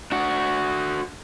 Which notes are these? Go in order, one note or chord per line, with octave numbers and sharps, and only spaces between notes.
D4 F#4